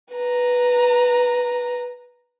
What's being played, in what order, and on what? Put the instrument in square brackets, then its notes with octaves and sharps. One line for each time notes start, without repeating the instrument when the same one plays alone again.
[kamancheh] B4 A#5